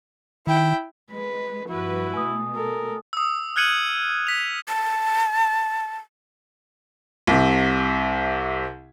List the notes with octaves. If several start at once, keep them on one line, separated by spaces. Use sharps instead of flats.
D#3 E4 G5
G#3 B4
G2 F3 E4 F#4 B4
B2 A3 G#5 D#6
A4 A#4
D#6 E6
F6 F#6 G#6 C#7 D#7 F#7
B6 F7
A5
C2 C3